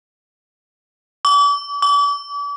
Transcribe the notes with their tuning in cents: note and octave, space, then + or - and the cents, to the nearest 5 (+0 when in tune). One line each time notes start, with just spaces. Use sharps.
D6 -40
D6 -40